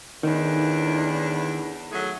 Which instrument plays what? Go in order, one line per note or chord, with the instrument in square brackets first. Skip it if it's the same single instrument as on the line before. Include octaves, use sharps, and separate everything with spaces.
[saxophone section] E2 A2 D4 [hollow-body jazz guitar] D#3
[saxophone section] F#3 A3 G#4